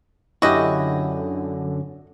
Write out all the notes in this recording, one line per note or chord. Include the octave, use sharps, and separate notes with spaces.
F#2 D3 E4 F#4 G4 D#5